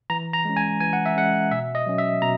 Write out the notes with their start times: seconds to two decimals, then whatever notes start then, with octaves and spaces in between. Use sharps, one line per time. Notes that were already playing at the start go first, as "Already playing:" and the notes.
0.10 E3 A#5
0.33 A#5
0.45 G#3 C#4
0.57 G#5
0.80 E3 G#5
0.93 F#5
1.06 E5
1.16 G#3 C#4 F#5
1.51 B2 E5
1.75 D#5
1.86 F#3 C#4
1.98 E5
2.22 B2 A#5